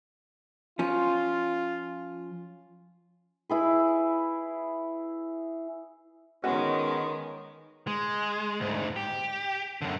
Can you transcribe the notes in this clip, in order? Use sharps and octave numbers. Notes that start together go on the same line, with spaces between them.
F3 C#4 F4
E4 G#4 B4
D#3 G#3 B3 C#4 F#4
G#3
D2 G#2
G4
F#2 D3